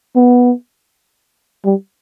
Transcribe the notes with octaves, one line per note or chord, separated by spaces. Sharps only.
B3
G3